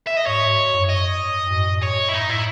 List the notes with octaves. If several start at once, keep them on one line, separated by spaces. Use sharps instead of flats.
E5
D#5
G#2 C#5
G#2
G#2
F#2
D#5
F#2
G#2
A2
G#2 C#5
E4
G#2 D#4
A2 E4